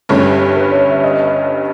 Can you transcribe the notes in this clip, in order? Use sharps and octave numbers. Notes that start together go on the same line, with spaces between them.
G1 G2 G3 C#4
B4
C#5
E5
D#5